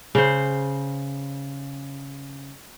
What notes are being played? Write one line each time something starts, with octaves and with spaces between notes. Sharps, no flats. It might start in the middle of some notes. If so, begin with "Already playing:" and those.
C#3 C5